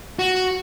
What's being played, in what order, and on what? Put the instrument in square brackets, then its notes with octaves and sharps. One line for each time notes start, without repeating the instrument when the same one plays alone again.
[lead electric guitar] F#4